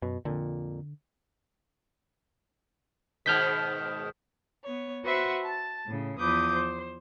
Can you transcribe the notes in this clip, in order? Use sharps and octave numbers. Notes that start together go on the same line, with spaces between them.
F#2 B2
F2 A#2 D3
G#2 B2 D#3 F6 G6 B6
B3 C#5
F#4 B4 C5 E5 F#5 C#6
A5 A6
A2 C#3
E2 F3 B4 D6 D#6 G6
C5